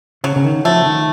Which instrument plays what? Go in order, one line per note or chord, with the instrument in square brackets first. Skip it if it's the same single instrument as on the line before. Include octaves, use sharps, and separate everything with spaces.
[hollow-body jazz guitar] C#3 [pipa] F#3
[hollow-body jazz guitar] C#3
D#3
[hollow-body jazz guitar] F3 [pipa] A3
[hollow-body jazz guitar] D#3